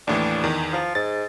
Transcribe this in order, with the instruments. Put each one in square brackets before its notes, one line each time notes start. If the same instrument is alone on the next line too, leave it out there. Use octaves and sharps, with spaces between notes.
[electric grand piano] D#2 A2 E3 [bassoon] D4
[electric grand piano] E2 D#3
[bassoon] F3
[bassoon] G#2 [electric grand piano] A6